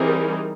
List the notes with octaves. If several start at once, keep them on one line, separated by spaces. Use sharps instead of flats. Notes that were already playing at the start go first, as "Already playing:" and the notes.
Already playing: E3 G3 C4 D#4 G#4 A#4